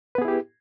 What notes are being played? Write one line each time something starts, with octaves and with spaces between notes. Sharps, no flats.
B3 E4 G4 G#4 B4